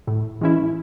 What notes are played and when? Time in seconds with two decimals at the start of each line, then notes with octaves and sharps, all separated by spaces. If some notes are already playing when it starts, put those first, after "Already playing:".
0.07 A2
0.41 E3 G#3 C#4 E4